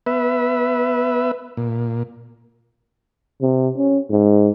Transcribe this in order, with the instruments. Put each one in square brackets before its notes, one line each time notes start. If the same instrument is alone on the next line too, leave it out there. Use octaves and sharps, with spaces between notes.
[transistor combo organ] B3 B4 E5
A#2
[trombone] C3
C#4
G#2